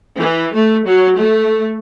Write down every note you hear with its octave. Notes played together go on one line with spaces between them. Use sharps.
E3
A3
F#3
A3